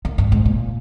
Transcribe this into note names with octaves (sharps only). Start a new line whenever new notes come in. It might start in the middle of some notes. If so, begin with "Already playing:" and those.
D#3
G2
G#2
A#2